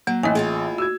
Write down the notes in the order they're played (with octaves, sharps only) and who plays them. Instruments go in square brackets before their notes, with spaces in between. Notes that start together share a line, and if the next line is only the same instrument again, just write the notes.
[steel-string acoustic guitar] F#3 [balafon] A#3
[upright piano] A1 [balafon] A3 D#5 G#5
[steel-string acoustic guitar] E4 F4 G#4
[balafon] F#4 [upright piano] E6 G#6